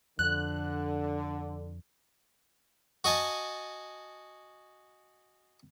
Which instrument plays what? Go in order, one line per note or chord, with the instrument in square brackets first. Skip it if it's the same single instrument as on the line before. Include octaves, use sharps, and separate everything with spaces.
[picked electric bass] F2 [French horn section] D3 [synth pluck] F#6
[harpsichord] F#4 D#5 G#5 A5